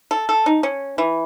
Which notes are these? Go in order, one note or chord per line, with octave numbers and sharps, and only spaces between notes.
A4
A4
D#4
C#4
E3